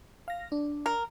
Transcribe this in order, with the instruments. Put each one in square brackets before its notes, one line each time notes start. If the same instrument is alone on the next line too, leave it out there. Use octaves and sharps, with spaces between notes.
[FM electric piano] F5 A#6
D4
[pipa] A#4